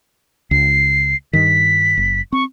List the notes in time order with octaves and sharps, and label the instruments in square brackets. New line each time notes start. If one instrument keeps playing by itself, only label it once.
[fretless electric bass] C#2 [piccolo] C7
[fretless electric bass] G2 D#3 [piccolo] B6
[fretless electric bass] F#1
[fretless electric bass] C4 [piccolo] C#6